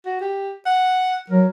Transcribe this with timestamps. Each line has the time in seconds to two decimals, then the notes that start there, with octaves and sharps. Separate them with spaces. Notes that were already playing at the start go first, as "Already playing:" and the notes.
0.06 F#4
0.21 G4
0.66 F#5
1.30 F#3 A#4